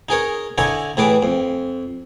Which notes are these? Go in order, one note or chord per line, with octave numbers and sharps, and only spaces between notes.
D#4 G#4 A#4 C#5
D3 E4 C#5 G#5 A#5 D#6
A2 E3 G#4 B4 D6
F2